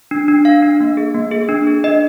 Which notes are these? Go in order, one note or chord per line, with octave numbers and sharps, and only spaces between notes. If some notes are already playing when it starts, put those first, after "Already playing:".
D4
D4
D4 F5
D4
A#3
G#4
A#3
G#4
D4
G#4
D4 D#5